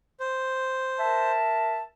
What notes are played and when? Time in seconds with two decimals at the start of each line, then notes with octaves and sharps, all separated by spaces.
0.20 C5
0.99 A#4 E5 A5